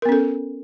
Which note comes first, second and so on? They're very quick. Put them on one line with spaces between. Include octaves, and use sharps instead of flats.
A#4 B3 C#4 A4